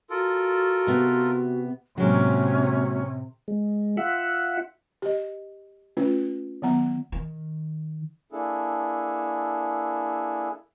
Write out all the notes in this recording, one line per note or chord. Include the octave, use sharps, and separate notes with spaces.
F4 F#4 A4 A#4
C3 B3
A2 C3 F#3 G#3 A#3 C#4 F#5
G#3
F4 E5 F#5
G4 D#5
A3 C#4 F4 B4
D#3 F#3 B3 F#5 A#5
D#3
A#3 D4 E4 G#4 A4